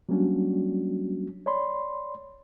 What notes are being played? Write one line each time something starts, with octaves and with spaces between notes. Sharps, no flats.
F#3 G3 A#3 C#4 D4 F#4
C#5 D5 B5 C6